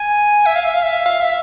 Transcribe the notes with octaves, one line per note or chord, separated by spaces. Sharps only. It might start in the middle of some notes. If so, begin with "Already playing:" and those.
Already playing: G#5
E5
F5
E5
F5
E5
F5
E5